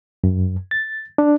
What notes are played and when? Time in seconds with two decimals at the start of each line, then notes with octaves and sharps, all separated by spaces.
0.24 F#2
0.71 A6
1.18 D4